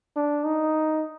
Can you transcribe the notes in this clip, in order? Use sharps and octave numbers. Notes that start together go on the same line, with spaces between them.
D4
D#4